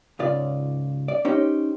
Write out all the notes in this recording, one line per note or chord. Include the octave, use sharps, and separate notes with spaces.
C#2 G#2 C#3 F4 D5
D5
C#4 D#4 G4 C5